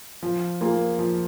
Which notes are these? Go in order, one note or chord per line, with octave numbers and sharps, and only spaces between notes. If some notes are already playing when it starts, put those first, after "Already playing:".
F3
A#3 F4 G#4
F3